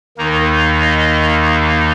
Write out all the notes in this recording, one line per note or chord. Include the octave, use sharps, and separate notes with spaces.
D#2 D#3 A#3 D#4 A#4
D#5